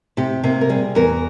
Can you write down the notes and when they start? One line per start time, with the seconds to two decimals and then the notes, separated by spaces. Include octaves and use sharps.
0.17 C3 G4
0.44 C3 A#3
0.61 A#4
0.69 G3 G#4
0.95 E2 A#4